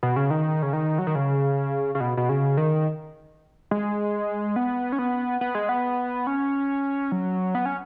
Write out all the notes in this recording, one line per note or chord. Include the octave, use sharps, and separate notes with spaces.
B2
C#3
D#3
C#3
D#3
F#3
D#3
C#3
C#3
B2
B2
C#3
D#3
G#3
B3
C#4
B3
B3
G#3
B3
C#4
F#3
B3
C#4